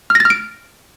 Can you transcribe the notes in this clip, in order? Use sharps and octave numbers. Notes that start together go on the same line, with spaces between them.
F6
A#6
A6
F6
D7